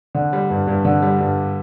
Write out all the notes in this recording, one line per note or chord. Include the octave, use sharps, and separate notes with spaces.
D3
G3
G2
G2
D3
G3
G2